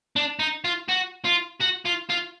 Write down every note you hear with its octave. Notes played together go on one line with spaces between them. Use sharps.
D4
D#4
F4
F#4
F4
F#4
F4
F4